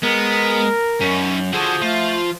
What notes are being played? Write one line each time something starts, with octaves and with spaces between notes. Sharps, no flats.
G#3 B3 A#4
F#2 C#4 D#4
D3 F3 F#4 G#4 A4 F#5
A3 F4